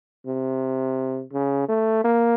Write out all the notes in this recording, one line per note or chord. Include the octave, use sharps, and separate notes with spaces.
C3
C#3
A3
A#3